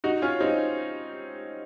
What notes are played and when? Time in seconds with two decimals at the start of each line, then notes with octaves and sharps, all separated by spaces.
0.04 D#4 F#4
0.22 C#4 F4
0.40 C4 D#4